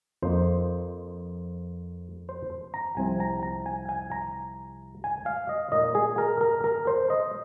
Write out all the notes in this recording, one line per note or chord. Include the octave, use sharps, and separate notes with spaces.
F2 F3 A#3 D#4 C5
C5
A#5
C2 C3 F3 C4 G#5
A#5
A#5
G#5
G#5
A#5
G#5
F5
D#5
A#2 A#3 D#4 D#5
G#4
A#4
A#4
A#4
C5
D#5